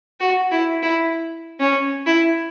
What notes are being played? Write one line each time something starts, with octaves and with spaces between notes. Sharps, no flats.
F#4
E4
E4
C#4
E4